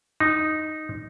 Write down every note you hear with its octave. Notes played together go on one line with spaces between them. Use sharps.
D#4